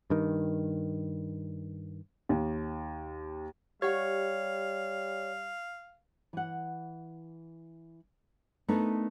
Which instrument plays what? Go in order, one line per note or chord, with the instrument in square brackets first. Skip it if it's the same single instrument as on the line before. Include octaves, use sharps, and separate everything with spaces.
[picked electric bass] G2 D#3
[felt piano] D#2
[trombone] G3 [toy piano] G4 F#5 [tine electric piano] C#5 [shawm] F5
[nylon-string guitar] E3 F#5
A3 B3 D4 D#4 A#4 B4